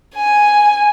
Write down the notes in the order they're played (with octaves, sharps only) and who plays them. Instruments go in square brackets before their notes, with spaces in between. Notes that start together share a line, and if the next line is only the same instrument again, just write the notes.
[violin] G#5